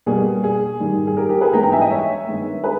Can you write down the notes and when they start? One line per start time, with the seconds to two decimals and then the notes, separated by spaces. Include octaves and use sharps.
0.06 B2 G3 A#3 G#4
0.44 G#4
0.80 G#2 D#3 G3
1.07 G#4
1.17 G4 A#4
1.29 G4 A#4
1.41 G#4 B4
1.53 G#2 E3 G#3 B3 G5 A#5
1.63 G5 A#5
1.72 E5 G#5
1.81 D#5 G5
1.90 C#5 E5
2.27 G2 D#3 G#3 B3
2.64 G#4 B4